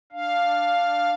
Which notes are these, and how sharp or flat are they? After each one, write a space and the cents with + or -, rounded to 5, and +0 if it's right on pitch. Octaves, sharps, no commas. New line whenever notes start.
D4 +5 F5 +0